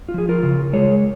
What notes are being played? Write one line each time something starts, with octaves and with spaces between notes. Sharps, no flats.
F4
F3 G#4
F4 A#4
C#3
G#3 G#4 C#5